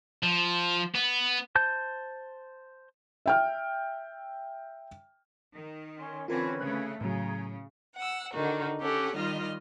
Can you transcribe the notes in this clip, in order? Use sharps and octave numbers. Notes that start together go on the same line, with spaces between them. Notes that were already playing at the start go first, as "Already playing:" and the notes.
F3
B3
C5 A5 G6
E5 G5 F6
D#3
C#4 C6
D3 E3 C4 C#4 F4 A#4 B4 G#6
C#3 A3 F#6
A2 C#3 F#3 G#4 A#5
F#5 E6
D3 D#3 D#4 F#4
C#4 G4 A4 C#5 F#5
D#3 G3 F4 D#5 F6